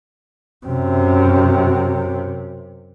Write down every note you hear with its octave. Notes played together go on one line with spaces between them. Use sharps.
F#2 C3